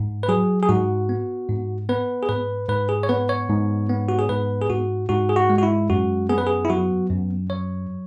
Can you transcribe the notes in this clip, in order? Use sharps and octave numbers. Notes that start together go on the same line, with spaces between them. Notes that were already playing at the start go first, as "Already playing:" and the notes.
Already playing: G#2
B4
F#3 G#4
G#4
G#2 F#4
B3
G#2
B3 B4
G#4
G#2 B4
G#2 B4
G#4
C#5
B3 B4
C#5
G#2
B3
F#4
G#4
G#2 B4
G#4
G#2 F#4
G#2 F#4
G#4
F#4
G#3
F#4
E4
F#2 F#4
B3 G#4
B4
G#4
E4
F#3 F#4
F#2
F#3 C#5